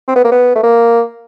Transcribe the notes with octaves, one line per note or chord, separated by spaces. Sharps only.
C4
B3
A#3
B3
A3
A#3